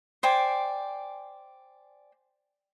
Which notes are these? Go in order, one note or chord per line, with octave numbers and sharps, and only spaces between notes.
C5 D5 G5 G#5